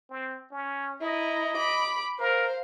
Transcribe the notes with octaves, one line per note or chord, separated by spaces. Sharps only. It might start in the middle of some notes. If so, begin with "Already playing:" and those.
C4
C#4
E4 D#5 A#5
B5 D6
A#4 C5 F5